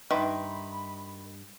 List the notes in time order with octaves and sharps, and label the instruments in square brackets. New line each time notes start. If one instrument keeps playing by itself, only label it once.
[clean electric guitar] G2 C6 [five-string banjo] D#3 [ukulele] B4 E5 [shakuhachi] B5